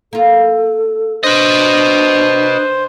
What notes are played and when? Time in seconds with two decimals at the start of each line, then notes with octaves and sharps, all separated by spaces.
0.13 A#3 F4 A4
1.24 D4 B4 C5 D#5